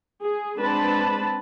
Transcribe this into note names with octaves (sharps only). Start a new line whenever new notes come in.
G#4
G#3 C4 D4 B4 A5 B5